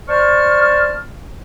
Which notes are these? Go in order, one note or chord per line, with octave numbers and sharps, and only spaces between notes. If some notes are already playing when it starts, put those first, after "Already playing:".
C5 D5 A5 C#6 F6